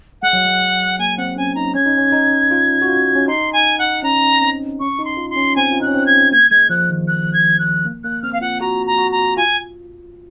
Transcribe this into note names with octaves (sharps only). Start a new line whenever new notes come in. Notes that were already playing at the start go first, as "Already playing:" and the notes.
G#3 F#5
F#3
G#3
A#3 G#5
C4 F#5
C#4 G#5
D#4 A#5
C#4 G#6
D#4
C#4
D#4
F4
F#4
F4
C#4
D#4 C6
G#5
F#5
C#4 A#5
C4
C#4 C#6
D#4
C6
F4
C6
C#4
C4 G#5
F4
D#4 F#6
C#4
C4
G#6
A#3 G#6
G#3 G#6
F3 F#6
D#3
F#6
G#6
F#6
A#3
A#3 F#6
C4 F6
F5
F4 F#5
F#4 A#5
A#5
F#4
A#5
F4 G#5